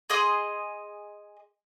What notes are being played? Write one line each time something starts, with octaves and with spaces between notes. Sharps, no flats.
G#4 D#5 C6 D#6